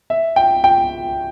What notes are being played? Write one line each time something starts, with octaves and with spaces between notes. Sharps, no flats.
E5
G5
G5